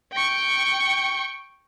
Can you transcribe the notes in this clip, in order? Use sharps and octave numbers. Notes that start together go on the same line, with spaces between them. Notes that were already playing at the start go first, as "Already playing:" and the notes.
G5 C#6